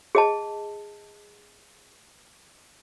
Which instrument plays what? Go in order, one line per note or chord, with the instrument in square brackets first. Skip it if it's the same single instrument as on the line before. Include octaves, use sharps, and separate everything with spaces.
[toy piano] G#4 D#5 A5